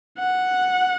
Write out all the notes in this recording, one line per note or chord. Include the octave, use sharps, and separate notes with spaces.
F#5